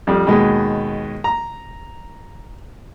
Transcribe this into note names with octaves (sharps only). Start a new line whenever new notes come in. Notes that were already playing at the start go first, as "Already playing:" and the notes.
F2 G3
D#2 B2 G#3
A#5